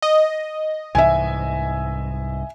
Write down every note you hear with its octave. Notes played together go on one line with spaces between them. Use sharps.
D#5
C2 G#2 E3 E5 G#5